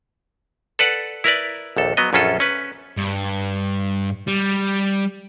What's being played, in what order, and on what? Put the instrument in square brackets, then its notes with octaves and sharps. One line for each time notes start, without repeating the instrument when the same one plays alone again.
[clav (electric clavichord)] A4 B4 D5 F#5
E4 A#4 B4 D5
A#1 D#2 A4
F#3 B3 D#5
A#1 F#2 C#4 F4 A4
C#4 B4
[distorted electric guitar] G2
G3